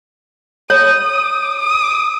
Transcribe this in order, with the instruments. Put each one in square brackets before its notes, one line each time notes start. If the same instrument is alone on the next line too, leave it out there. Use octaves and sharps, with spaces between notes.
[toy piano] C#5 [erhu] D#6
[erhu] D#6